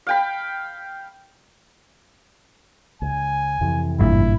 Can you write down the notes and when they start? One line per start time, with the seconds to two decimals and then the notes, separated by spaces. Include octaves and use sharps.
0.07 F5 G5 B5
3.02 C#2 G#5
3.61 F2 C3 E3
3.99 G#1 G2 A#2 E4